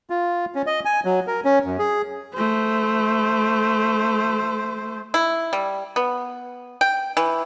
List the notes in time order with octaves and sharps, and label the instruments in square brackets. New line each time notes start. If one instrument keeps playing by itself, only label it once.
[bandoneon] F4
C#4
D#5
G#5
F#3
A#4
C#4
F#2
G#4
[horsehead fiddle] A3 C5
[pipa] E4
G3
B3
G5
E3